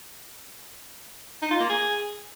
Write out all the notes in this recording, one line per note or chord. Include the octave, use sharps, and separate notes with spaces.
D#4
F4
A#3
G#4